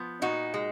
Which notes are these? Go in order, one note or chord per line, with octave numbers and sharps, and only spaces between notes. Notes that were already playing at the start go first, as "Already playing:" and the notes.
Already playing: F3 B3
A#2 D#4 F#4
G#3